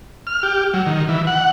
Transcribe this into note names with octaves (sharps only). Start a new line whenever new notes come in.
F6
G4
F#3
D#3
E3
F#5